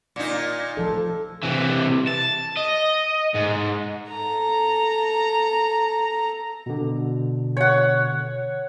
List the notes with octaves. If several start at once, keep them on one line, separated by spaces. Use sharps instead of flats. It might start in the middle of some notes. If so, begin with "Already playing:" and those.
A#2 D#4
F3 A4
C3 E3
A5
D#5
G#2
A4 A#5
B2 D3
C#5 F#5